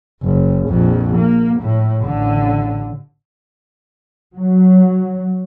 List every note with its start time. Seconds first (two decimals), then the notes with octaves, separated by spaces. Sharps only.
0.23 F#1
0.68 A#1 F2
1.16 A#3
1.60 A2
2.05 A1 D3
4.35 F#3